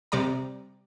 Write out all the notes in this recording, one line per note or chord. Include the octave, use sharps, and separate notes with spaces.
C3 G3 D5 A#5